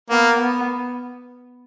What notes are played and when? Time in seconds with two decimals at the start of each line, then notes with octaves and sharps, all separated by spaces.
0.10 A#3 B3
0.39 B3